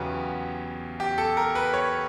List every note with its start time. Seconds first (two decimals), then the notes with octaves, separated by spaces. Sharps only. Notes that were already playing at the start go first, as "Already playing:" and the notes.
Already playing: E2 C#3 F#3 B3 G4
1.00 G4
1.18 A4
1.37 A#4
1.55 B4
1.73 C#5